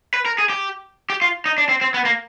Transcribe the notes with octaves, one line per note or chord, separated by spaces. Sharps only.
B4
A#4
G#4
G4
G4
F4
D#4
D4
C4
C4
B3
A#3